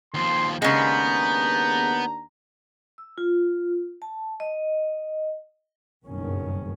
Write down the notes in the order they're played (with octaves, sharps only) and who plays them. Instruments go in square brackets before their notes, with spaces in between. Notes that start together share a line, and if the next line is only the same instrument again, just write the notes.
[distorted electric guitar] D#2 F3 [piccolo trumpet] C6
[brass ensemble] D#2 D4 A#5 [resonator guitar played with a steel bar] C#3 G#3 [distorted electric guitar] B3 [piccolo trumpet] G6
[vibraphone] E6
F4
A5
D#5
[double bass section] F#1 B1 G2 D#3 C#4